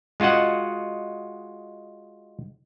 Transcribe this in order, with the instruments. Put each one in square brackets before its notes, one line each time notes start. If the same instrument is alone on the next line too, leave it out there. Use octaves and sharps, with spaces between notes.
[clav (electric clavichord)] G#3 F4 F#4 D#5 F#5